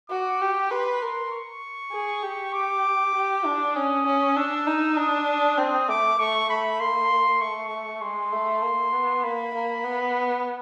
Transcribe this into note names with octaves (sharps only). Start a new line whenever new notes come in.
F#4 D6
G4
B4 C6
A#4
C#6
G#4
G4
D6
G4
D4
C#4 D#6
C#4
D4 E6
D#4
D4 D#6
C4 D#6
A3 D6
A3 C#6
A3 B5
A#3 C6
A3 C#6
G#3 C6
A3
A#3
B3
A#3 B5
A#3
B3